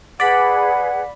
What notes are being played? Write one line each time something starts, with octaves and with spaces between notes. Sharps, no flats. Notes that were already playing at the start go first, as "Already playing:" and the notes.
G#4 B4 D5 F#5 B5